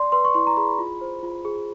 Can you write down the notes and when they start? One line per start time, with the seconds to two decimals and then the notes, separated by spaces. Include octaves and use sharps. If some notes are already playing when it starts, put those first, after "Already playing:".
Already playing: D5 C6
0.12 B4 C6
0.25 C#6
0.34 E4 C6
0.47 A#5
0.57 G#4 B5
0.79 F4
1.01 C5
1.23 F4
1.45 G#4